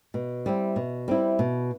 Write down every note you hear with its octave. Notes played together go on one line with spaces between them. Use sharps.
B2
G3 C4 E4
B2
G3 C4 E4
B2